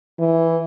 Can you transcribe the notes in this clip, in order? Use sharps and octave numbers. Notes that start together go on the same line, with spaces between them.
E3